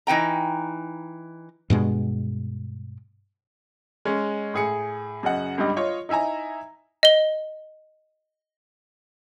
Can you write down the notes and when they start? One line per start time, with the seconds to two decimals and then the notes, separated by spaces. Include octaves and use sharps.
0.07 E3 D#4 G5 A#5
1.70 G2 B2 G#3
4.05 G#3 C#4
4.54 A2 G#4 C#7
5.23 F#2 C#3 D#5 F#5
5.58 C#2 G2 G3 D#5
5.76 F4 C#5 D#5
6.09 D#4 E4 E5 G#5 A#5
7.03 D#5 G7